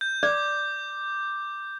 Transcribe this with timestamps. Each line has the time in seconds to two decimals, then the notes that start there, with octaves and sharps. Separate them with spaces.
0.01 G6
0.23 D5 D6